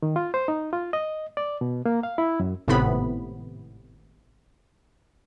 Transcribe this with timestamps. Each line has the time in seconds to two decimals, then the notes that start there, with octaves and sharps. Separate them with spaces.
0.02 D#3
0.16 F4
0.34 C5
0.48 D#4
0.73 F4
0.93 D#5
1.37 D5
1.61 B2
1.86 A#3
2.03 F5
2.18 E4
2.40 F#2
2.68 G#1 A2 C3 B3 B5